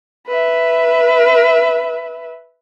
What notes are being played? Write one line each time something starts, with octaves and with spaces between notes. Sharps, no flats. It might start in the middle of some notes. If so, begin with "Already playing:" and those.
B4 E5